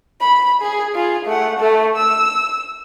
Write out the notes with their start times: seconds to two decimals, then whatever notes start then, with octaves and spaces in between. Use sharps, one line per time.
0.21 B5
0.62 G#4
0.95 F4 G#4
1.26 A3 F#5
1.59 A3 A4
1.96 E6